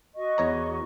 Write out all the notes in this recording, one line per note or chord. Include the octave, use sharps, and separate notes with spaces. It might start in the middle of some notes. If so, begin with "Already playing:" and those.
F#4 D#5 C#6
E2 C#5 A#5